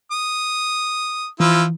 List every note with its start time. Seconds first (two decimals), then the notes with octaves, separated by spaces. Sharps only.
0.11 D#6
1.40 E3 F3 E4 F4